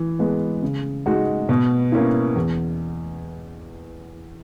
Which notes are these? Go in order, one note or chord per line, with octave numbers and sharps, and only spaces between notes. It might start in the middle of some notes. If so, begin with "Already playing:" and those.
Already playing: E3
G#3 B3
C#3
G#3 D#4 F#4
B2
A#3 C#4 E4
E2